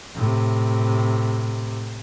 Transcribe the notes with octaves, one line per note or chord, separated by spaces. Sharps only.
A2 C3